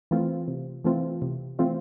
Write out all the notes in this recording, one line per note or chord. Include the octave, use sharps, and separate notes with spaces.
E3 A3 C4 F4
C3
E3 A3 C4 F4
C3
E3 A3 C4 F4